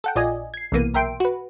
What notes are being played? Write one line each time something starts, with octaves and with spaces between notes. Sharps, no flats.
A4 F#5 G5
A#1 F4 D5 D#5 G#5
G#6 C7
B1 C3 E3 A#3 B3 D#7
B1 A#4 E5 G5 C6 D7
F#4 B4